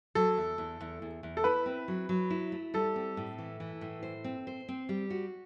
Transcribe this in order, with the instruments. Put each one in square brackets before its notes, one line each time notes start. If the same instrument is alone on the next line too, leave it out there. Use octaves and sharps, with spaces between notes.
[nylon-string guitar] F#3 [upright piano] A4
[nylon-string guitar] E2
E2
E2
E2
E2
[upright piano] A4
[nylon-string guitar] E4 [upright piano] B4
[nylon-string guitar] C4
F#3
F#3
E4
A3
[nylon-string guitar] G3 [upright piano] A4
[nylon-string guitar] C4
A2
E3
E3
A2
C5
C4
C5
C4
G3
F#4